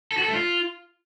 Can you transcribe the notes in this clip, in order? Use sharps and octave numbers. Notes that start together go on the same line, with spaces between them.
A4
F#4
A4
A3
F4